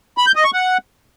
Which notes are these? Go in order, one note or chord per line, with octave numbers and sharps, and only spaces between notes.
B5
G6
D#5
C#6
F#5